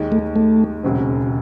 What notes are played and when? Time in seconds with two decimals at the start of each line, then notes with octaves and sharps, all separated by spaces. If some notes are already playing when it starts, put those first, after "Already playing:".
Already playing: D#2 D#3 G#3
0.12 A3
0.36 A3
0.83 E1 D#2 C#3 F#3 C4